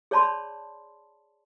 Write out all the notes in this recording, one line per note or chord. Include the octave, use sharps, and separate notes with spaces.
G#4 C#5 D5 A5 B5 C6